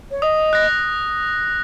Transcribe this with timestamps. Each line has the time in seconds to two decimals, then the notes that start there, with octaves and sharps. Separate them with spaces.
0.11 C#5
0.22 D#5 D#6
0.53 F#6 A#6